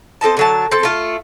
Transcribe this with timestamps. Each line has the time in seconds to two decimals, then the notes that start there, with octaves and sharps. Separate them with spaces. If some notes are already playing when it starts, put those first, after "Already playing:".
0.21 C4 A4 D#5 A5
0.37 D3 F#3 A5
0.71 C4 A4
0.83 A3 F4